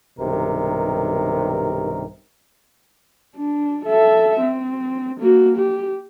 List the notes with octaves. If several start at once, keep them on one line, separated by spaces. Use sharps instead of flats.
B1 G2 C3 D#3 A#4
D4
A4 E5
C4
A#3 F#4
G4